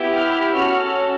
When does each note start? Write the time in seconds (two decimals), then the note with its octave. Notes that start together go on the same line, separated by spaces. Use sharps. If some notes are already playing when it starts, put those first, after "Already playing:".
Already playing: B3 E4 G4
0.15 F6
0.54 C#4 F#4 A4 F6